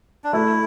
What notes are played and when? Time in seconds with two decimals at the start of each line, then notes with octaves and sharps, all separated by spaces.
0.24 D4
0.33 A3 E4